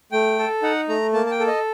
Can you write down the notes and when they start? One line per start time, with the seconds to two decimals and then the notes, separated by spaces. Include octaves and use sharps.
0.12 A3 G5
0.38 A4
0.63 D#4 F#5
0.88 A3 A#5
1.13 A#3 A5
1.26 A5
1.31 G5
1.40 A4
1.47 D#5